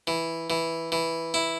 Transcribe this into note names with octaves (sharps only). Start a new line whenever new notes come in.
E3
E3
E3
E4